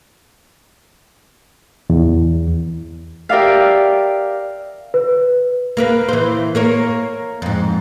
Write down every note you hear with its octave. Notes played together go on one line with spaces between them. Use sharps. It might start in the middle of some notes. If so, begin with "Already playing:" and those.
E2
G4 A#4 D5 E5 F5
B4
A#3 A#4 B4
E3 C5
A#3 A#4 C#5
F2 G#2